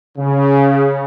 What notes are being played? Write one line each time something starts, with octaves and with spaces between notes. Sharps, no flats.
C#3